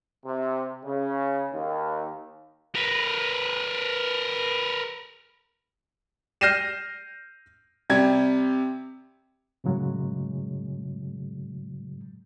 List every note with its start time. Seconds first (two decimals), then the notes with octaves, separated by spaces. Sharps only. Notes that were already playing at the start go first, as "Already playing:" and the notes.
0.24 C3
0.84 C#3
1.52 D#2
2.75 A#4 B4
6.41 F6 G6 A#6 C7 D#7 E7
7.90 C3 G3 G#6
9.64 F#2 A2 C#3 F#3 G#3